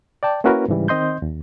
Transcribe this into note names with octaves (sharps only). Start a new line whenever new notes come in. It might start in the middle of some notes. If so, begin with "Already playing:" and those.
D5 G5 A5
A#3 C#4 E4 F#4 A#4 B4
G#2 C#3 E3 G3
D#3 C4 D#5 C6 G6
D#2